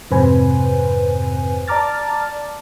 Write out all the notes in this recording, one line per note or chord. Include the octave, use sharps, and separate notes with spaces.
F2 G#2 C3 B4 C5 G#5
D5 A5 A#5 D6 F6 A6